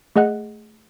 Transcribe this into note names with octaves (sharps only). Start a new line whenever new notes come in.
A3 G#4 D#5 F#5 F#6